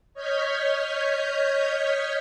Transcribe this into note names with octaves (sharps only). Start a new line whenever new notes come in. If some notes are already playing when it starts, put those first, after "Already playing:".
C#5 D#5 F6 G6 G#6 B6